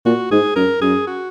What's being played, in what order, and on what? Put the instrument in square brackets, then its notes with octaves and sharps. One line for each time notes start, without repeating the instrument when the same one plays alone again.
[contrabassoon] A#2 [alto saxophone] F#4
[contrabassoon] G#2 [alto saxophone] G#4
[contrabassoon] F#2 [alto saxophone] A#4
[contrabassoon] F#2 [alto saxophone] G#4
[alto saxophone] F#4